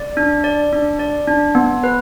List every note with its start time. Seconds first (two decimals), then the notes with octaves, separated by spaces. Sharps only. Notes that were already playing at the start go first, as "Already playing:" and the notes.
Already playing: D5
0.17 D4
0.44 D5
0.73 D4
0.99 D5
1.28 D4
1.55 B3
1.84 B4